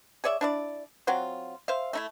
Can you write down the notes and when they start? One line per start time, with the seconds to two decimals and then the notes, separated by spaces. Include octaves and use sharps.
0.24 G#4 C#5 D5 E5
0.41 D4 E4 D5
1.07 F#3 C4 F4 F#4
1.68 C5 E5 F5
1.93 A3 D#4 E4